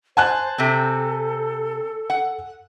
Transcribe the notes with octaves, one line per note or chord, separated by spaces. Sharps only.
C5 G#5 A5 F#6
C3 C4 A4
F#5